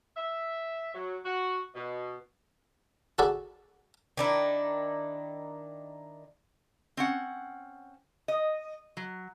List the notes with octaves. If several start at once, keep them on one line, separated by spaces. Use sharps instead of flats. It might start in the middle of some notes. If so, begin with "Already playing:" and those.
E5
F#3
F#4
B2
F#4 G#4 A4 B4 D5
D#3 D4 E4
C4 C#4 F#5
D#5
F#3